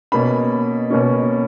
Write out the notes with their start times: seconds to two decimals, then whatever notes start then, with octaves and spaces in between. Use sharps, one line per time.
0.12 B2 A#3 C#4 B5
0.90 B2 A#3 C#4